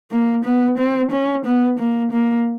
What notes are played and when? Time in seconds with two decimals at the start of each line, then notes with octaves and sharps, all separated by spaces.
0.11 A#3
0.45 B3
0.78 C4
1.11 C#4
1.45 B3
1.79 A#3
2.12 A#3